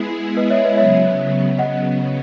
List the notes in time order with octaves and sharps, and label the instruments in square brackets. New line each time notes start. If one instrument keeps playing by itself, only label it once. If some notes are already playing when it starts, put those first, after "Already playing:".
Already playing: [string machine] G#3 B3 E4 G#4
[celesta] B4 D#5
C#5 E5
B4 D#5
[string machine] C#3 F#3 B3 [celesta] C#5 E5
[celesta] D#5 F#5